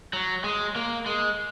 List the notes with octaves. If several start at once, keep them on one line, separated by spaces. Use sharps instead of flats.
F#3
G#3
A#3
G#3